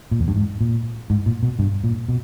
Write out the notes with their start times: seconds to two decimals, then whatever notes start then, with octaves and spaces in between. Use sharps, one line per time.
0.11 A#2
0.20 E2
0.28 G2
0.36 G#2
0.61 A#2
1.10 G#2
1.26 A#2
1.43 B2
1.59 G2
1.84 A#2
2.08 B2